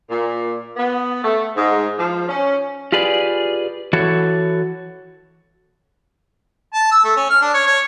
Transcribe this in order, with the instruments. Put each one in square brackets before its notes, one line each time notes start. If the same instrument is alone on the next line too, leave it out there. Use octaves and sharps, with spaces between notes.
[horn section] A#2
B3
A3
G#2
F3
C#4
[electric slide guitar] F4 G4 G#4 B4 D5
E3 F#4 A4 C#5
[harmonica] A5
E6
A3
C#4
F6
D4
C#5
C#5